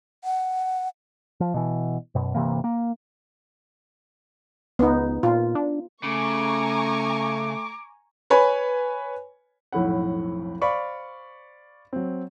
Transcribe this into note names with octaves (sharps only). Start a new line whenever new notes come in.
F#5
F3
B2 E3
F#2 B2
G1 C3 E3 A#3
A#3
C#2 B3 D#4
A#2 F4
D4
C#3 A3 G#5 A#5 C#6 D6
B4 C#5 G#5 B5
B1 F2 A2 E4 F#5
C5 D5 F5 B5 C#6
F#3 C4